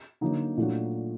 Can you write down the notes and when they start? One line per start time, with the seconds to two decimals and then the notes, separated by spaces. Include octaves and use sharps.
0.21 D3 F#3 A#3 D#4
0.57 A#2 F#3 A3 D4 F#4